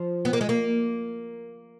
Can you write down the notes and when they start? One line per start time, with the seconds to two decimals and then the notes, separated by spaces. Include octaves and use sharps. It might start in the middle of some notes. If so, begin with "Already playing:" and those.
Already playing: F3
0.25 B3
0.33 A#3
0.41 G#3
0.49 A#3